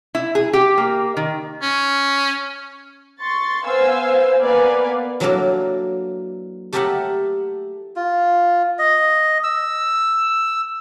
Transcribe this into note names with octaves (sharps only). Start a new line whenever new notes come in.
E4
G#4
G4
A#3
D#3
C#4
C6 C#6 A6
B3 C5 F5 G#5 E6
A#3 B3 B4 D5 F5 G#5
E3 F#3 A#3 D4 A4 A#4
A3 G4 A4 A#4 E5 F#5
F4
D#5
E6